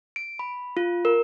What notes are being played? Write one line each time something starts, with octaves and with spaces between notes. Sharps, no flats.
D7
B5
F4
A#4